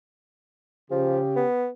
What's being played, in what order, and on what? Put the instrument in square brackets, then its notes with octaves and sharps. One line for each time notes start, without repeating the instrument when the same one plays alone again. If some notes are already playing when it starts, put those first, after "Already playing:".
[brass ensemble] C#3 G4 [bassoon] F3
[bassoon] B3